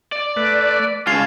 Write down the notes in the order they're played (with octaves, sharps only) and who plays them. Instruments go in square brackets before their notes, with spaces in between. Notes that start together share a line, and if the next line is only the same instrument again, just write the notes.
[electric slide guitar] D5
[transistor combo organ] A3 B4
[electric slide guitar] C#3 G#3 F4 [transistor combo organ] G#5 A5 [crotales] F6 C7 F7